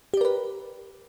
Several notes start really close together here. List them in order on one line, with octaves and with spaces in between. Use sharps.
G4 D5 A#4 B4